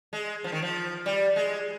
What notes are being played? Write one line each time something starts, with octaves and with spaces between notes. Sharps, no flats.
G#3
F3
D#3
F3
G3
G#3